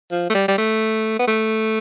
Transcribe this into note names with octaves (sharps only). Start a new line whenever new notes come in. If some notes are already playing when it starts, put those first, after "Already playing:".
F3
A3
G3
G3
A3
B3
A3